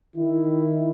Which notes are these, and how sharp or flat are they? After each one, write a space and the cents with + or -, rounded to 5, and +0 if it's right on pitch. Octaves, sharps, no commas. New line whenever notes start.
D#3 +5 E4 +0